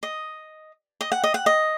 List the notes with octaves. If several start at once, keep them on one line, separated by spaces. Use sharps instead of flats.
D#5
D#5
F#5
D#5
F#5
D#5